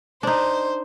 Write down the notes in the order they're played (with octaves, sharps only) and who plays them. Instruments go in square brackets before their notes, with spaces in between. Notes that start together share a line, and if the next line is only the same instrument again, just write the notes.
[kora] D4 D#4 [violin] C5